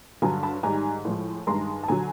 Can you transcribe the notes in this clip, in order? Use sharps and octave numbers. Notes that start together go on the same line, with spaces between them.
G2 D3 F#3 G#5 A#5
A5 B5
G#2 D#3 G3 G#5 A#5
A2 F3 G#3
G2 D#3 G#3 A#5 C6
A5
D3 F#3 G#5 A#5